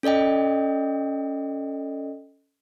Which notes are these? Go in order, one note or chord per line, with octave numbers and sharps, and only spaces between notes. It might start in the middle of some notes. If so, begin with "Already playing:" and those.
C#4 A4 D5 D#5 G5